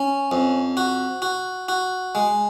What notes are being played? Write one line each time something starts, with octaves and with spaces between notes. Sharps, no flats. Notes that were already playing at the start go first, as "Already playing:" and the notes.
Already playing: C#4
F2
F#4
F#4
F#4
G#3